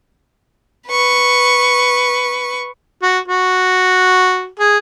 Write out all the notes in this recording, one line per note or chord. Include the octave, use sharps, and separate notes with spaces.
B4 C#6
F#4
F#4
G#4